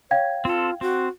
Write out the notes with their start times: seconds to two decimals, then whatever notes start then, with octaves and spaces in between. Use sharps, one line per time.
0.11 C#5 F5 G5 G#6
0.45 C4 F4 A4
0.81 C4 F#4